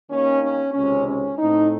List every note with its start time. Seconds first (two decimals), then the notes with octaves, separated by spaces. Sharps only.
0.10 D#2 D#3 A#3 C#4
0.43 C#4
0.74 C#2 C3 D#3 C#4
1.07 C#4
1.38 A2 A3 C4 D#4